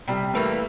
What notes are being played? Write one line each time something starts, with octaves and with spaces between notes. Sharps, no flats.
C3 G3
E3 A3 A#3